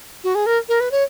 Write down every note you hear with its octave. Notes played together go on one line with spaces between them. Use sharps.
F#4
G#4
A#4
A#4
B4
C#5